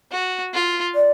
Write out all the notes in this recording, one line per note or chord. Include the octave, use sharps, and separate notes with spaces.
F#4
F4
D5